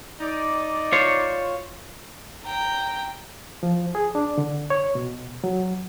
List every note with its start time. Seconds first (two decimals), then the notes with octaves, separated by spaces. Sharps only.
0.20 D#4 D5
0.92 F4 C5 C#5
2.44 G5 A#5
3.63 F3
3.95 G#4
4.15 D4
4.38 D3
4.70 C#5
4.95 B2
5.44 F#3